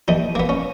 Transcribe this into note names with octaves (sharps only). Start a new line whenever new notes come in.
D#2 D#4
A#3 B3
C#4